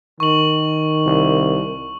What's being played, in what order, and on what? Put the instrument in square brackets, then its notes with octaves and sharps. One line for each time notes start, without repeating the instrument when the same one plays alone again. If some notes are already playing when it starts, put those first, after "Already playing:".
[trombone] D#3 [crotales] C#6 F#7
[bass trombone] C2